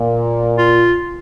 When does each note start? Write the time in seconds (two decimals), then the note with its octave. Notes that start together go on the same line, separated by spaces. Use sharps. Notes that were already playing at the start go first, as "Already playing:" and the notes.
Already playing: A#2
0.58 F4